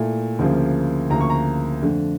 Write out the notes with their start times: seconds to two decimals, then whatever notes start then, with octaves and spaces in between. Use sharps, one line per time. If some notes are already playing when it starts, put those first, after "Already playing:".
Already playing: A#2 A3 E4
0.39 D2 C#3 F3 A#3
1.10 D2 C#3 F3 A#3 A#5
1.21 C#6
1.30 A#5
1.82 F2 D3 A3